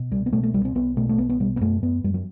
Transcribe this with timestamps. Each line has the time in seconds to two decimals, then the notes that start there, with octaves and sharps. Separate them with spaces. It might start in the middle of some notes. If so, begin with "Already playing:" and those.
Already playing: B2
0.11 C2 G3
0.26 B3
0.32 B2 A3
0.43 A3
0.54 C2 G3
0.65 C4
0.75 B1 B3
0.97 B2 A3
1.09 A3
1.18 B1 B3
1.29 B3
1.40 B2 G3
1.56 B3
1.61 F#2 A3
1.82 F#2 B3
2.04 F#2 G3
2.14 F#3